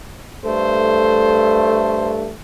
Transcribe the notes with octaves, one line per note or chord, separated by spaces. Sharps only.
G2 A3 C5